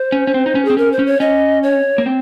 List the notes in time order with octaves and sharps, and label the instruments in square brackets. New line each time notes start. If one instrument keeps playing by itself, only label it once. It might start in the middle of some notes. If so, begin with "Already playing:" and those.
Already playing: [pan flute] C5
[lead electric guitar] C#4
C#4
C4
D#4
C#4
[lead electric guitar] C4 [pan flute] G#4
[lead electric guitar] C#4 [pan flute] A#4
[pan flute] C5
[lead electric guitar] C#4
[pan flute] C#5
[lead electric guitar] C#4 [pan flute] D#5
[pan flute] C#5
[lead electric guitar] A#3
C4